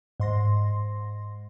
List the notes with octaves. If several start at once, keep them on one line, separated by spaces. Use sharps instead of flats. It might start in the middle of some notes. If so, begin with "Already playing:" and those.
G#2 C6 A#6